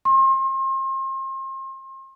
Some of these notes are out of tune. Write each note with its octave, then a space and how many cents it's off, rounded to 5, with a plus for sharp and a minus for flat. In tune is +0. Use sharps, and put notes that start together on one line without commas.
C6 +40